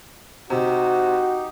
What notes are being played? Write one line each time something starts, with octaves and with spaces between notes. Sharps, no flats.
C3 D#4 F#4 G4